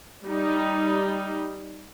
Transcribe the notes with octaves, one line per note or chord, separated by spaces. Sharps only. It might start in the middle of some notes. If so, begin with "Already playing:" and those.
G3 D#4